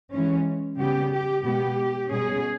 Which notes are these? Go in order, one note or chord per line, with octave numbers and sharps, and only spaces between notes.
E3 G#3 C#4
C#3 G3 B3 G4
G4
B2 G#3 B3 G4
B2 G3 C#4 G#4